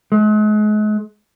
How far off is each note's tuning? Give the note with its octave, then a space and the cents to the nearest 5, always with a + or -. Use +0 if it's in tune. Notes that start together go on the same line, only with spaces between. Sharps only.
G#3 +40